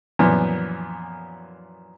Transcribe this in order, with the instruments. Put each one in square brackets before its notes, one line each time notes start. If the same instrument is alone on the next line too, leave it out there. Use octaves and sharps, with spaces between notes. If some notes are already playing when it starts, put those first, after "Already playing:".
[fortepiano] F#2 A#2 E3 F3 B3